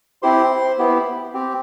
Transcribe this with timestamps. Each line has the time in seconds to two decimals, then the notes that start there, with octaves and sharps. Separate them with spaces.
0.22 C4 E4 G4 C5 C6
0.79 B3 E4 G4
1.34 C4 G4